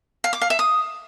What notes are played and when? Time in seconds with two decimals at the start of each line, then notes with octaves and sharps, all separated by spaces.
0.24 F5
0.33 D6
0.41 F5
0.50 E5
0.59 D#6